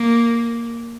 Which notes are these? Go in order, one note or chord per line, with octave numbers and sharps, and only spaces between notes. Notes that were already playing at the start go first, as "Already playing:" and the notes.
Already playing: A#3